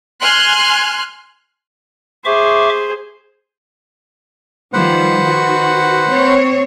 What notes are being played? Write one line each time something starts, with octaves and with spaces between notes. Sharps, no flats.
G#5 C6 F6 F#6
G#4 C5 E5 C#6 D6
D#3 F3 G3 B4 C5 F#5
D#3 F#4
C4 C#5